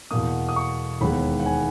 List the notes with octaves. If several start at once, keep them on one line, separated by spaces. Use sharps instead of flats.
E2 B2 A#3 D#6
D#6
C#6
E1 D#2 D#3 G#3 B3 B5
F#5
G#5